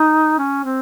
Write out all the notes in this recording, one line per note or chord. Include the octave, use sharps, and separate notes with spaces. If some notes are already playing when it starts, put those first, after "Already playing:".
Already playing: D#4
C#4
C4